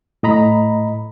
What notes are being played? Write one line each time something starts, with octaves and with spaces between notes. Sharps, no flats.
A2 D#5 A#5 B5